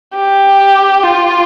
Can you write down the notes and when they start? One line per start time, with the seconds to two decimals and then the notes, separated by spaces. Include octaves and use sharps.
0.16 G4
1.03 F4